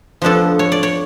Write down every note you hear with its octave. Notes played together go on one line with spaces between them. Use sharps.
F2 F3 B3 D4 A4
C#5
D5
C#5